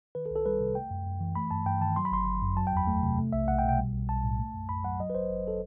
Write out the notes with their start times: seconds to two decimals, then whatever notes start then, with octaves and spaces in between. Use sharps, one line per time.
0.15 D#3 B4
0.26 A4
0.31 C2
0.36 A4
0.46 G3 B4
0.60 C3
0.75 A3 G5
0.91 F#2
1.06 F#2
1.20 E3
1.35 A3 B5
1.51 G2 A5
1.66 G2 G5
1.81 D#3 A5
1.96 F#3 C6
2.05 B5
2.12 G1 C6
2.27 G1
2.42 F#2
2.57 F#3 A5
2.67 G5
2.73 E2 B5
2.87 A3
3.03 C3
3.18 A3
3.33 B1 E5
3.48 B1 F#5
3.58 G5
3.64 B2
3.69 G5
3.79 G3
3.93 B1
4.09 B1 A5
4.24 A2
4.39 A3
4.54 F#2
4.69 F#2 B5
4.84 F#3 F#5
5.00 F#3 D#5
5.10 B4
5.14 G1 C5
5.30 G1
5.48 A4